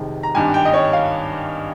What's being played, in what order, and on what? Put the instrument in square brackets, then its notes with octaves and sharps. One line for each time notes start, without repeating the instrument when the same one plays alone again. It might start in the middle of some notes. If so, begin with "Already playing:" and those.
Already playing: [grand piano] F1 F2 C3 D#3 G#3
A#5
G#1 G2 D#3 G#5
G5
D#5
C#5
F5